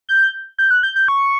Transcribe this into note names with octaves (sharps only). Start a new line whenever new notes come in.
G6
G6
F#6
G6
G6
C#6